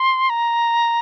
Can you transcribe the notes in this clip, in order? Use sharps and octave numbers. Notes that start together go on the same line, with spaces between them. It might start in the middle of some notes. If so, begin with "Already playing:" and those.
Already playing: C6
A#5